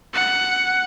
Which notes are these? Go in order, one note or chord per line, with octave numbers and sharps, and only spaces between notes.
F#5